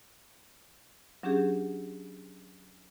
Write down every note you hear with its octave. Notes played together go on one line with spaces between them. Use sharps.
F#3 C#4 D4 G4 G#4